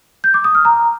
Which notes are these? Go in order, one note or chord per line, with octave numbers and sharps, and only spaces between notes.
G6
D6
D#6
F6
A#5